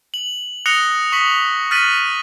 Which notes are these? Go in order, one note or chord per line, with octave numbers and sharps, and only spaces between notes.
F#7
D#6 F#6 A#6 C#7 F7 G7
C#6 D#6 B6 F#7
F6 F#6 A6 B6 D#7 F#7